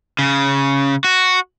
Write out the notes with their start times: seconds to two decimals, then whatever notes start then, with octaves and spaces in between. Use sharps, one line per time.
0.19 C#3
1.04 F#4